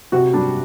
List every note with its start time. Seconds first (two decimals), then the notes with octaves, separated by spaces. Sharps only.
0.12 C3 F#4
0.33 G3 D4